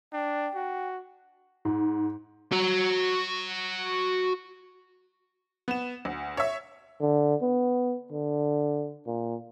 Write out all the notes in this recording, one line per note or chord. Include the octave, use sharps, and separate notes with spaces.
D4 G5
F#4
G#2
F#4 A#5
B3 E7
D2
C#5 E5
D3
B3
D3
A#2